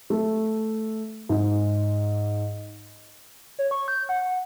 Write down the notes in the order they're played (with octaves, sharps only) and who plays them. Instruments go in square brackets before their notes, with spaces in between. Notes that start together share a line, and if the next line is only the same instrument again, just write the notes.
[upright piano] A3
G#2
[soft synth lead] C#5
C#6
G6
F#5